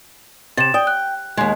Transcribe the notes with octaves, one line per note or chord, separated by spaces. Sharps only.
C3 A6 E7
D5 G5 D#6
F#6
D#2 G#3